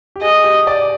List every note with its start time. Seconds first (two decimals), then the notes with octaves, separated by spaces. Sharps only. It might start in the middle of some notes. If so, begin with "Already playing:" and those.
0.16 G4
0.21 G#4 D#5
0.44 G4
0.67 D5